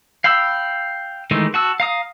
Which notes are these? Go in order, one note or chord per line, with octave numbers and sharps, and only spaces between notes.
F5 G5 B5 E6
D#3 E3 G#3 A3 D#4
F#4 A5 E6
F5 A#5 D#6